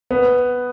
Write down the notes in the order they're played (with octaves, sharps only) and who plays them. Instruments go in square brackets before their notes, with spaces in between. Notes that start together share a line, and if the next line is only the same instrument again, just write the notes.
[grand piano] B3